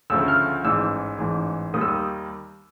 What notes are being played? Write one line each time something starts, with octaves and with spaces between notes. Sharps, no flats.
D2 C#3 F3 A3 E6
F6
A1 G#2 E3 E6
A1 G#2 E3
D#2 D#3 G3 A#3 D#6
E6
D#6